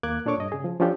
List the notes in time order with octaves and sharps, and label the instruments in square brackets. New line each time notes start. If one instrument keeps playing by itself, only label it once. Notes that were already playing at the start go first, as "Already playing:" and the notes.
[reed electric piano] D#2 A#3 D6 F#6 G#6
A#2 D4 A4 C#5 C#6 D6
G2 D#5
C#3 G#4
F3
F3 C#4 D4 F4 G4 A4